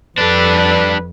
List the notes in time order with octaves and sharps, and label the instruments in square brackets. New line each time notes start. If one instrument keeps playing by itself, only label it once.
[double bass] F2 [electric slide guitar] G3 D4 [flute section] A4 D5 [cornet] B4